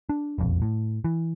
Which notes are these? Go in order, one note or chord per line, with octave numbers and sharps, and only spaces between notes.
D4
E1 A#1 F2
A2
E3